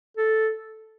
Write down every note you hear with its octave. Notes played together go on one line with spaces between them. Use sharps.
A4